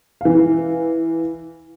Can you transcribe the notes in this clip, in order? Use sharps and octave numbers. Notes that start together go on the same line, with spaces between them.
E3 F5